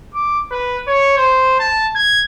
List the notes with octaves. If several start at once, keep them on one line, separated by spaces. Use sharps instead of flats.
D6
B4
C#5
C5
A5
G#6